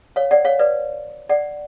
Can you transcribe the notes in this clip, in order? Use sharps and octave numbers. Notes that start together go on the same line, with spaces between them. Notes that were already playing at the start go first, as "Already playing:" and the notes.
C#5 F5
D5 F#5
C#5 F5
B4 D5
D5 F#5